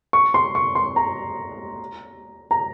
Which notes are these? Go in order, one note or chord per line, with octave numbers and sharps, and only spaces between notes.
C#6
C6
C#6
C6
A#5
A#5